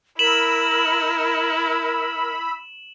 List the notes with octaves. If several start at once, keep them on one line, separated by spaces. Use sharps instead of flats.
E4 A#4 B5 E6 E7 F#7